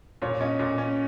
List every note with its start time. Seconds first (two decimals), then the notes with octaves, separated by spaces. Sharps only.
0.22 A#2 C#5
0.41 C#4 D#5
0.59 A#2
0.78 C#4